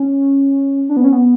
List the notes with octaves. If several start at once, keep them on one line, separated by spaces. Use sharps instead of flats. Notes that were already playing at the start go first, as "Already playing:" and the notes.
Already playing: C#4
D4
B3
C#4
B3